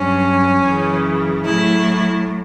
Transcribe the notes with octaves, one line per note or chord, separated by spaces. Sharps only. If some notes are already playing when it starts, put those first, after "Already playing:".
Already playing: G2 F#3 C#4
F#2 C#3 E3
A2 F#3 E4